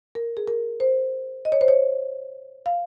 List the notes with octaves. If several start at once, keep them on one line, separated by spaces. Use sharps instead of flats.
A#4
G#4
A#4
C5
D#5
C#5
C5
C#5
F5